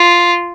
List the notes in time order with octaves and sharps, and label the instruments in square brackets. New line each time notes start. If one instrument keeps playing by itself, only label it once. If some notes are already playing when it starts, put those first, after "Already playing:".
Already playing: [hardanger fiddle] F4